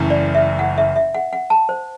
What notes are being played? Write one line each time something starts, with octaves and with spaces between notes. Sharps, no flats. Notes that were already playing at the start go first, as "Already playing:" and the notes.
Already playing: F#1 F#2 E3 A3 E4
D5
E5
F#5
E5
E5
F#5
F#5
A5
C5